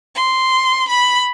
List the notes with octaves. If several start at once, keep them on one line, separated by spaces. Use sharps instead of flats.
C6
B5